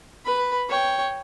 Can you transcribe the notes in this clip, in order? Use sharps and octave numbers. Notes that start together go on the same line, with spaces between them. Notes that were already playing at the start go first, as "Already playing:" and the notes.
B4 B5
C#5 G5